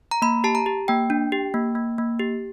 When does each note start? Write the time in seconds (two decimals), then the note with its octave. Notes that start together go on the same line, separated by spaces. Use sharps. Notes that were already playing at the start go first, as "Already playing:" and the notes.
0.11 A#5
0.22 A#3 B5
0.44 G4 A5
0.55 A#5
0.66 G4
0.88 A#3 G5
1.10 D4
1.32 G4
1.54 A#3
1.75 A#3
1.98 A#3
2.19 G4